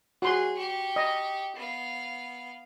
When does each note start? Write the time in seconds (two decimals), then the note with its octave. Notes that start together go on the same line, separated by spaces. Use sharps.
0.22 F#4 G#4 C6
0.56 G4 C#6
0.96 D#5
1.56 B3 F5